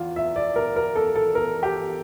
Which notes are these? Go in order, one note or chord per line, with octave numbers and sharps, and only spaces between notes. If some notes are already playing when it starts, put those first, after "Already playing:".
Already playing: E2 F4
E5
D5
A#4
A#4
A4
A4
A#4
G4